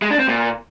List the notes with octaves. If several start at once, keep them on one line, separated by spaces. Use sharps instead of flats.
G#3
D4
C4
A#2